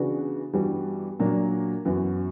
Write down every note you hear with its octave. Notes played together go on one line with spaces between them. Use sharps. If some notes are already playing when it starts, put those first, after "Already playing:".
Already playing: C#3 E3 B3 D4 F#4
G2 E3 G3 B3 F#4
A#2 F#3 A#3 D4
F#2 E3 B3 F#4